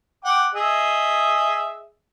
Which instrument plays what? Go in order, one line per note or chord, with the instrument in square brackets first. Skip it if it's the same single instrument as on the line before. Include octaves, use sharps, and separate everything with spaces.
[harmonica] F#5 G5 D6
G#4 D#5 E5